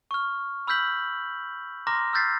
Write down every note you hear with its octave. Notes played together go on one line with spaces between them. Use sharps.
C#6 F6
B5 E6 F6 G6 B6 F#7
A#5 C6 D6 F6 A#6
E6 F6 G6 A6 B6 C7